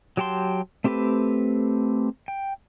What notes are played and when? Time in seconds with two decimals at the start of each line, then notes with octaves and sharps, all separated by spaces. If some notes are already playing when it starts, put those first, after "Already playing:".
0.17 F#3 G4 G5 A5 C6
0.84 A3 C4 G4 A4 B4
2.28 G5